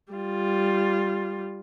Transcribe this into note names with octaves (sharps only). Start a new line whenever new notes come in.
G3 F4